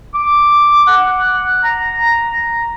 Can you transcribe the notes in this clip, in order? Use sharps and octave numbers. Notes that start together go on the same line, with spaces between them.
D6
F#5
A#5